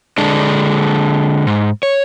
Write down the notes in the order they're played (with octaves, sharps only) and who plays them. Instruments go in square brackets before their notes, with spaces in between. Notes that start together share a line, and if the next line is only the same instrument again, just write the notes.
[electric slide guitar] D3 G#3 D4
G#2
C#5